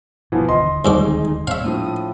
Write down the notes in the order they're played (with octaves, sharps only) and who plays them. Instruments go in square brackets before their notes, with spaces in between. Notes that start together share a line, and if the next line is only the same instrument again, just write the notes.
[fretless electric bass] G1 G2 B2 [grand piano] E3 F3 B3
[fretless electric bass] D#1 D2 [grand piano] D#5 C6
[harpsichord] C2 G#2 D6 [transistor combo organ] D#3 G#3 D#4
[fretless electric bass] A#2 [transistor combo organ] C4 C#5 [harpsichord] E5 F5
[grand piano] A2 F3 [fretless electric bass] D4 [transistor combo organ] D#6